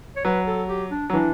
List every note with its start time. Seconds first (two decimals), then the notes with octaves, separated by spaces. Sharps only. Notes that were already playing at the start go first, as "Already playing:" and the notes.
0.16 C#5
0.25 F#3 B4
0.47 A4
0.69 G4
0.91 D4
1.10 F#3
1.13 E3 D4